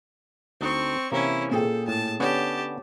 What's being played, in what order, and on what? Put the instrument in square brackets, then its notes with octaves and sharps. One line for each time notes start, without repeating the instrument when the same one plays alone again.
[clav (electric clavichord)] D2 D#4 D#5 [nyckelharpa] C4 C#6
[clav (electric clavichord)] C3 E3 A#3 [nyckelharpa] C#4 E4 [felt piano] A#5
[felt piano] A#2 G#4 G5 [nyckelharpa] A4
[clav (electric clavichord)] A2 [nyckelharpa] A5
[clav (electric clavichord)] D3 B3 C#4 [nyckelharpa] G4 A5 [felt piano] C#5